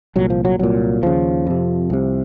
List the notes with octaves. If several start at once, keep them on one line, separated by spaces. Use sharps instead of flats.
C2 A#2 F#3
F3
F#3
C2 A#2 F#3
D#2 C#3 F3
F2 C3
C2 C3